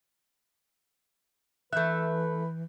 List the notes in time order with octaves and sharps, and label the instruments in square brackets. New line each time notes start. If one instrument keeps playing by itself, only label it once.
[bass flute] E3 [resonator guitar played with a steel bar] A3 E5 [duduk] B4 [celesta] F#6 G6